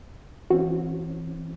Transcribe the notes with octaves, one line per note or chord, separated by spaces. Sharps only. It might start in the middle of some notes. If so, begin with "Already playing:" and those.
E3 C4 C#4 F#4